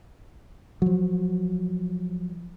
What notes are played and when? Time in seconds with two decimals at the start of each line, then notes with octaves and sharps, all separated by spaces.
0.82 F3 F#3